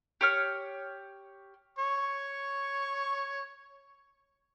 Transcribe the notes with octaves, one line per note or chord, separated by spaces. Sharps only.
G4 C#5 F6
C#5 C#6